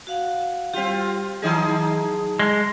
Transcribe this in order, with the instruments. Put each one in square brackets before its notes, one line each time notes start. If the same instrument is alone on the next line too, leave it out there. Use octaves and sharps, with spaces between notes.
[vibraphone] F#4 F5 F#5
[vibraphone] G3 G4 [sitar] C4 F4
[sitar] D#3 D#4 G#4 [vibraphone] F#3 A5
[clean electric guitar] G#3